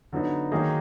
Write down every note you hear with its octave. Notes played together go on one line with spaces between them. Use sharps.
D3 F#3 B3 D#4
D#3 F#3 A#3 D#4 G#4